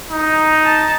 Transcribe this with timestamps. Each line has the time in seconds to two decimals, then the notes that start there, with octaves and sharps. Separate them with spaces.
0.10 D#4
0.65 A5